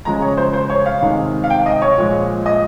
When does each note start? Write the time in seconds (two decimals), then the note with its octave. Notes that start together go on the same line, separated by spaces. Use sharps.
0.05 C#3 F3 G#3 A#5
0.22 C#5
0.37 C5
0.53 C5
0.70 C#5
0.86 F5
1.01 C3 D#3 G#3
1.44 F5
1.50 G5
1.66 D#5
1.82 C#5
1.97 A#2 F3 G#3
2.46 D#5